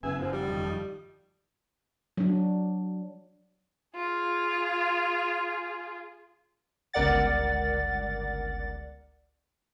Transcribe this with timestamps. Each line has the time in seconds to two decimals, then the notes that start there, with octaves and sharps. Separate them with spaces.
0.03 F#1 B3 C#4 G#4 E5 G#5
0.19 F#2 F3
0.32 G3
0.48 F2 D#3
2.17 F#3 D4
3.95 F4 G#4
6.93 G1 C#2 A#4 D5 F#5 A6